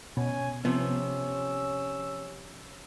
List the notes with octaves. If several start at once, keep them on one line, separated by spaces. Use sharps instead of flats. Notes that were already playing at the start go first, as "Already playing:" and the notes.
B2 C#4 G#5
C3 F3 B3 C#4 E6